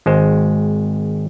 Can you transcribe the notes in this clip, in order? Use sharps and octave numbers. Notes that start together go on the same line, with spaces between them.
G#1 G#3 C5